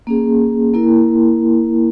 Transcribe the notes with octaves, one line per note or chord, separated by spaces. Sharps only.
A#3 C#4 G#4
A#3 E4 A#4